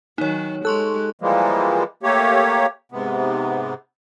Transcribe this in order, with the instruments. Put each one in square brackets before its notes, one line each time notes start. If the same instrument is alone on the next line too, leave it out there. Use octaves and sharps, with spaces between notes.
[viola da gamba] D#3 F#3 [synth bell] D#4 C#5
[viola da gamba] G#3 G4 [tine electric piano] A4 [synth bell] C6 C#6 F#6
[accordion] E3 F3 G3 G#3 A#3
A3 A#3 G4 C#5
G#2 C3 B3